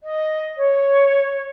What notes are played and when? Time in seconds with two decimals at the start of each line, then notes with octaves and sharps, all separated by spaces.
0.03 D#5
0.57 C#5